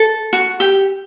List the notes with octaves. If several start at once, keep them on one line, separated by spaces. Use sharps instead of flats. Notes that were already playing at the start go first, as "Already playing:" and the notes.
Already playing: A4
F#4
G4